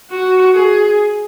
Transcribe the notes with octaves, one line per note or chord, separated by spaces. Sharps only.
F#4
G#4